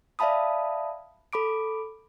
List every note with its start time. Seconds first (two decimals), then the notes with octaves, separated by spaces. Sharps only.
0.19 D5 E5 F5 A5 B5 D#6
1.33 A4 B5 D6 D7